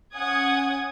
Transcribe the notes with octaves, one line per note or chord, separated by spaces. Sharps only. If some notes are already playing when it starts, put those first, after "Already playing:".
C#4 F#5 G#5 D#6 G#6